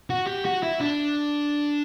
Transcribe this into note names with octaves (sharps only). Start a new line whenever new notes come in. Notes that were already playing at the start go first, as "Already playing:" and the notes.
F#4
G4
F#4
E4
D4